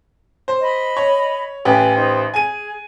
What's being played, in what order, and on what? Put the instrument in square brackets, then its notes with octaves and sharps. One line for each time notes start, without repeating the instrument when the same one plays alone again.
[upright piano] C5
[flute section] D#5 B5
[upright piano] C#5
[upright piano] A1 G4 B4 [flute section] F5 G#5
[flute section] D#4 C5
[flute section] G#4 [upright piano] G#5 D#7